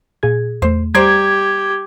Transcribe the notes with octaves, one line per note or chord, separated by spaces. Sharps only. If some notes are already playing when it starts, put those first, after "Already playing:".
A#2 G#4 G#6
E2 A3 C5
G3 G4 C5 D5 A#5 G#6